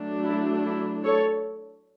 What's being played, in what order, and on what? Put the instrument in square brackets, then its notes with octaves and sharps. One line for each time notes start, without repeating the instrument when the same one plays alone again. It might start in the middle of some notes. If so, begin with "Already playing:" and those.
Already playing: [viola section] F#3 A3 D4
E4
E4
A4 C#5